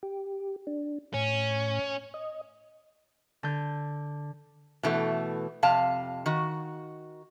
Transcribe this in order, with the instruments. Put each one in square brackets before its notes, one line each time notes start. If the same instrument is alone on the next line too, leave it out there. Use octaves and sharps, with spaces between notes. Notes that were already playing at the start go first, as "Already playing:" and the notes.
[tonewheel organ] G4
D4
[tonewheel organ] A2 [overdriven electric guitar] C#4
[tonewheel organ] D#5
[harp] D3 G6
[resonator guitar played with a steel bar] B2 E3 A3
F2 C3 F5 A5
D#3 F#4